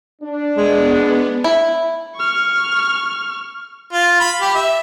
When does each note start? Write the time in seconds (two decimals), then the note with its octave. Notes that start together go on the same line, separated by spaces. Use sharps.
0.22 D4
0.57 G#3 B3
1.44 E4
2.16 C#6 F6
3.93 F4
4.20 B5
4.41 G4
4.55 E5